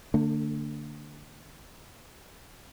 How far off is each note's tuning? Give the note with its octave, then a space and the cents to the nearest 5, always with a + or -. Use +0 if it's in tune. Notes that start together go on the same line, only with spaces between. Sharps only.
D3 +5 A3 +45